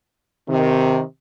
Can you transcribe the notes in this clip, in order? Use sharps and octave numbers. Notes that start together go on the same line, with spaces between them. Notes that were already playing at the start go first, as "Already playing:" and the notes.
C3 D#3